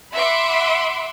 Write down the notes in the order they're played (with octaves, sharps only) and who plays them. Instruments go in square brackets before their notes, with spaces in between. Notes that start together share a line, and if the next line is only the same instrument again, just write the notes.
[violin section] E5 F#5 B5 C6 D6